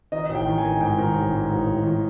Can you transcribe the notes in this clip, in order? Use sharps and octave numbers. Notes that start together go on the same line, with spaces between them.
D#3 D#5
A1
G5
D#3
G#5
D#3
G#2 G5
D#3
A1
G#2
A1
A1
D#3